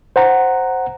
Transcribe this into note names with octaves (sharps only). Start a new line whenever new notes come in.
C5 F#5 A#5